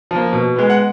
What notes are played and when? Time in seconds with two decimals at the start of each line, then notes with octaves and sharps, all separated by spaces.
0.11 F3 A#3
0.33 B2
0.56 G#3 B3
0.70 F#5